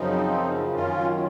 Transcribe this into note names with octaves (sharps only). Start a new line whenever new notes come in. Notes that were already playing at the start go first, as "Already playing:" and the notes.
Already playing: F#2 C#3 F3 C4 D#4
F#2 D#3 C#4 F4